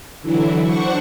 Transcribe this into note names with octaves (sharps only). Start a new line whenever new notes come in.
D3 E3 F#3 E4
D4 C5 F#5 C#6